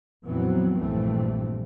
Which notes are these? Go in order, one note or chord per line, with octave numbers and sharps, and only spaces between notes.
F2 A#2 E3 F#3 B3 C4
A#1 G2 E3 G3 A3 C4